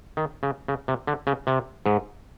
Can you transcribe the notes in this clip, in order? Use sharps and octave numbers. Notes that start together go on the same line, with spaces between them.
D#3
C#3
C#3
C3
D3
C#3
C3
G#2